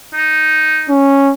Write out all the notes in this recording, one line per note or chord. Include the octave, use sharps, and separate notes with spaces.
D#4
C#4